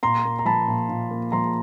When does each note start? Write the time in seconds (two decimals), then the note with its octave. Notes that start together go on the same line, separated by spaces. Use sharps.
0.03 A#2 A#5 C6
0.25 A#3
0.39 A#5
0.45 F3 A5 B5
0.68 A#2
0.89 A#2
1.10 A#3
1.32 F3 A#5 C6